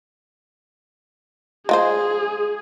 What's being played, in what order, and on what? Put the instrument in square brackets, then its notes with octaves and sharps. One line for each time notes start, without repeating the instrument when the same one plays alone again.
[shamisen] G#3 F4 C5 [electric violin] G#4